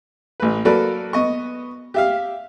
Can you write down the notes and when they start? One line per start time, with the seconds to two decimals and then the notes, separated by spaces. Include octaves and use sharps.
0.40 A1 B4
0.65 F#3 A#3 F#4 A4 B4 D5
1.13 B3 D#5 C#6
1.94 G4 E5 F5